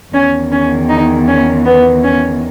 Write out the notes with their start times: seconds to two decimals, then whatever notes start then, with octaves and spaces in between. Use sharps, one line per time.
0.13 E2 D#3 C#4
0.52 C#4
0.89 D#4
1.28 C#4
1.65 B3
2.03 C#4